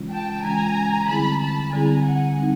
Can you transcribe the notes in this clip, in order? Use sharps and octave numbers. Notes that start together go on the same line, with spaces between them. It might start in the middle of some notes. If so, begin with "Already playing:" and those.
Already playing: C#3 E3 G#3 C#4 F4
G5 A5
C#3 E3 G#3 C#4 F4 G#5 A#5
D3 G3 C4 E4 G#4 A5 B5
A5 B5
D3 G3 C4 E4 G#4 G#5 A#5
F#5 G#5
G3 C4 D#4